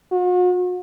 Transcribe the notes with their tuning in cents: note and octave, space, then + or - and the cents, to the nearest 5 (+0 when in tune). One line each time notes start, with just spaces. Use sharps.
F#4 -45